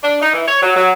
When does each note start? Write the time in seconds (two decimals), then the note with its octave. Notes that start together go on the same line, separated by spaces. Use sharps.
0.03 D4
0.21 D#4
0.34 E3
0.47 C#5
0.62 F#3
0.75 F#3